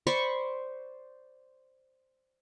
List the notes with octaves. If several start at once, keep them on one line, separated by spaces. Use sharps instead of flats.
C5 D5 B5 C#6